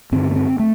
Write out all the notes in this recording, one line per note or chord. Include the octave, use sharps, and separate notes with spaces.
G2 D3 C4
B3
C4
A3